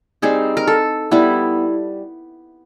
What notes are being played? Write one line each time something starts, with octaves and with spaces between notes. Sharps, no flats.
G3 C4 D#4 G#4
A#4
A4
G3 B3 E4